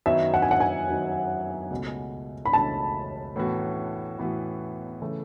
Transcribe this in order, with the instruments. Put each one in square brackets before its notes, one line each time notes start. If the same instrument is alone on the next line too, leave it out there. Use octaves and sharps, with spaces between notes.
[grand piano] F#2 D#3 F#3 B3 D#4 [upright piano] E5
[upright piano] F#5
G#5
F#5
G#5
[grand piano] F#2 D#3 F#3 B3 D#4
C#2 B2 A3
[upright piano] B5
[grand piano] C#2 B2 A3 [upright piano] A5
[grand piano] A2 E3 B3 F#4
A2 E3 B3 F#4
C#3 E3 A3 E4